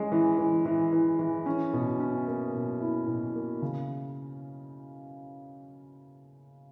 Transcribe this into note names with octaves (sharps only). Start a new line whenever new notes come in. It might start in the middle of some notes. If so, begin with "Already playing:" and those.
Already playing: G#3 C#4 G#4
E3
E3
E3
E3
E3
C#4
B2
C#4
A#3
B2
E4
B2
A#3
C#3